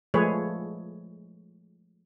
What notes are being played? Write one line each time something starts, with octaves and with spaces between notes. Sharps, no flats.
F3 G#3 A3 G#4 B4 C#5